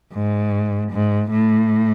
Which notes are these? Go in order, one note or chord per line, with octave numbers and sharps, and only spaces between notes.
G#2
G#2
A2